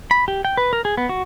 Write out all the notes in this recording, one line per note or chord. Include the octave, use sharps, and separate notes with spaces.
B5
G4
G5
B4
A#4
G#4
B3
F#4